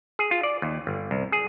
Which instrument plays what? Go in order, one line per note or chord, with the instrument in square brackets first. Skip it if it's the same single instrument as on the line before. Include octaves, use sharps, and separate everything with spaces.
[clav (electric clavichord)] G#4
F4
D5
D#2
G1
C2
G#4